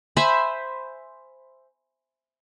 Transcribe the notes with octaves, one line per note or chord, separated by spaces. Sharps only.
C5 E5 G#5 B5